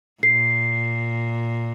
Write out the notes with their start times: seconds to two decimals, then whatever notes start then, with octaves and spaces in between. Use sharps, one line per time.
0.23 A#2 C7